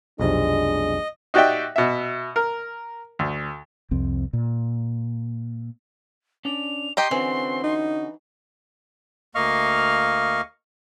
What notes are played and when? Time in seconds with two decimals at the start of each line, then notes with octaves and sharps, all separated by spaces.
0.20 B1 F2 C3 G#3 D4 D#5
1.34 D#4 F#4 G4 D5 E5 G5
1.76 B2 E5
2.36 A#4
3.19 D2
3.91 C2 F2 C4
4.33 A#2
6.45 C#4 D4 D5 F7
6.97 G4 D#5 A#5 C6
7.11 D3 E3 C4 C#4 F#4
7.64 D#4
9.35 D2 A#3 D#5 F5 C#6 F6